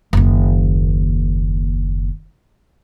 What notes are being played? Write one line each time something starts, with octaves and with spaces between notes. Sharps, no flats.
F#1 D#2